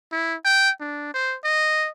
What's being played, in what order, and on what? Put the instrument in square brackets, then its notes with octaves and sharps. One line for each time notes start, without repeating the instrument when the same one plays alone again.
[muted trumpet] E4
G5
D4
C5
D#5